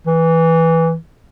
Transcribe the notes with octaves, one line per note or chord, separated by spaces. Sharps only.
E3